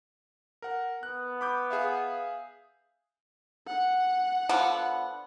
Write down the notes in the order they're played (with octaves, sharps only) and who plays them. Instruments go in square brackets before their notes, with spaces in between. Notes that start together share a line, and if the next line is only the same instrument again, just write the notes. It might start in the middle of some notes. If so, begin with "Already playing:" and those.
[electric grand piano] A#4 F#5
[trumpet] B3 [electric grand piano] F#6
[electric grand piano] B5 D6 G6
G#4 E5 F5
[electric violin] F#5
[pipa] D3 F3 B3